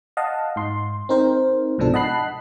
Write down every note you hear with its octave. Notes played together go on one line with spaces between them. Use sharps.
D#5 F5 F#5 A5
G#2 C6
C4 D#4 A#4 C5
C2 G#2 B2 F3 D4 A4
D#5 F#5 A5 B5 F#6 C7